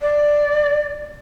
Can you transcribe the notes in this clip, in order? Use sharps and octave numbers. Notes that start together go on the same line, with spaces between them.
D5